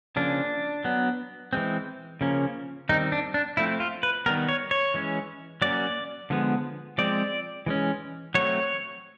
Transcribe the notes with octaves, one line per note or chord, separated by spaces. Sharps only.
C#3 F3 A#3 C#4 D4
F#3 B3
E3 G#3 C4
C#3 F3 A#3 C#4
D#3 G3 C4 D#4
D4
D4
F3 A3 C4 E4
F4
B4
D#3 G3 B3 A#4
C#5
C#5
E3 G#3 C#4
F#3 A#3 C#4 D5
D3 F3 G#3 B3
F3 G#3 C4 D5
E3 G#3 C#4
F#3 A3 C4 C#5